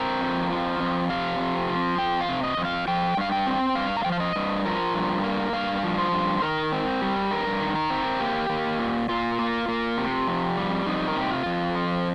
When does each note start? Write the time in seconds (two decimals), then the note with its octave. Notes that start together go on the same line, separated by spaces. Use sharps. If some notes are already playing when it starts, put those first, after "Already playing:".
Already playing: C4 A#4
0.21 F2
0.50 F3
0.80 F2
1.10 C3 F5
1.40 F2
1.68 F3
1.98 F2 G5
2.21 F5
2.28 C3
2.43 D#5
2.57 F2
2.65 F5
2.88 F3 G5
3.17 G2 F5
3.32 G5
3.47 C4
3.75 G2 F5
3.97 A#5
4.04 F3 G5
4.12 F5
4.20 D#5
4.36 G2
4.65 F3 A#4
4.94 G2
5.24 A#3
5.53 G2 F5
5.83 F3
5.98 C5
6.12 G2
6.42 D#3 A#4
6.72 C4
7.02 G3
7.31 G2 A#4
7.61 D#3
7.76 A#4
7.90 C4
8.20 A#3 G4
8.49 A#3
8.79 A#2
9.09 A#2 F4
9.39 A#3
9.68 A#3
9.98 C3
10.28 F2
10.57 G3
10.86 F2 D#4
11.08 A#4
11.16 C3 G4
11.31 F4
11.46 F2
11.75 F3